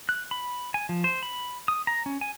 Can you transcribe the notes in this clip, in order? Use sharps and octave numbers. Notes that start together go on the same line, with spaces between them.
F#6
B5
G#5
F3
C5
B5
D#6
A#5
C#4
G#5